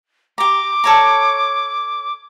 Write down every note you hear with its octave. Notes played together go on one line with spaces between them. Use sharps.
G4 A#5 D6
A4 C#5 A#5